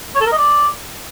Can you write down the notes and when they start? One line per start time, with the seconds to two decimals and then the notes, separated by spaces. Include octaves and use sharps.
0.15 C#5
0.21 A4
0.27 A#4
0.32 D#5
0.38 D5